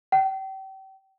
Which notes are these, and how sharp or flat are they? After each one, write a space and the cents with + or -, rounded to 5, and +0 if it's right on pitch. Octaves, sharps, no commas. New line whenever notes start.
G5 -35